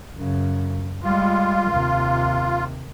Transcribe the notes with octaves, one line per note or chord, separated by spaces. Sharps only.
F#2 C#3
G3 G#3 F4
D#2 C3